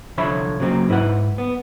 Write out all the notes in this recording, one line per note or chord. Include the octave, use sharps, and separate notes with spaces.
C2 D3 F3 C#5 E5 B5
C#3 F#3 A#3 C4
G#2 E4 B4 E5 F#5
B3